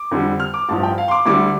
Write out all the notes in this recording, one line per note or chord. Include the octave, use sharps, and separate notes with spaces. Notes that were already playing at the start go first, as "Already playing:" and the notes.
Already playing: D6
F2 D3 G3
F6
D6
A1 G2 F3 A5
G5
F5
C6
D6
D2 D3 G3 D6